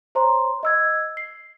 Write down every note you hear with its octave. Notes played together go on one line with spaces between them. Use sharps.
C5 C#5 A#5 C6
D#5 E6 G#6
C7